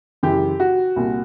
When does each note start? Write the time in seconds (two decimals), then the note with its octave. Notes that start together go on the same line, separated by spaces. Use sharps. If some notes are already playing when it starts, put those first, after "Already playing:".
0.23 F#2 C#3 E3 G4
0.60 F#4
0.96 C2 A#2